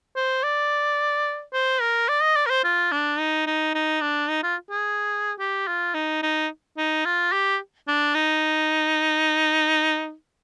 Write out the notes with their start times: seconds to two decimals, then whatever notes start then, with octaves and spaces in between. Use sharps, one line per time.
0.16 C5
0.43 D5
1.53 C5
1.81 A#4
2.09 D5
2.22 D#5
2.36 D5
2.46 A#4
2.50 C5
2.64 F4
2.92 D4
3.19 D#4
3.47 D#4
3.74 D#4
4.01 D4
4.29 D#4
4.43 F4
4.71 G#4
5.39 G4
5.67 F4
5.94 D#4
6.23 D#4
6.78 D#4
7.05 F4
7.32 G4
7.88 D4
8.15 D#4